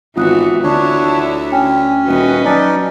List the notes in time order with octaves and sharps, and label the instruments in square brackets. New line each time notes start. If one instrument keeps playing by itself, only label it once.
[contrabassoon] G#1 [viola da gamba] E3 B3 F#4 [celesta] F4 D#6 F#6
[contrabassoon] D2 [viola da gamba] D3 E4 [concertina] D4 C#5
[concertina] C#4 [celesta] G5 G#5
[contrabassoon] D#1 [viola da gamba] F#4 B4 D#5
[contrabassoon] F#3 [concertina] C#4 D#4 D5 [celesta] G#5 A5 A6